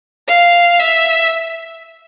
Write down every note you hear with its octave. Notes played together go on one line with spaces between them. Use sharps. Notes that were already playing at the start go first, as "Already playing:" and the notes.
F5
E5